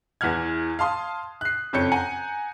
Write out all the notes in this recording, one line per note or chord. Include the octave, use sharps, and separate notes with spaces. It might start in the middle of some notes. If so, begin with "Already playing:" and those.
E2 E3 F#5 F6 G#6
F5 A5 C6 D#6
F#6 C7
F#1 F2 A4 C#5 G6 C#7
F#5 G#5 A#5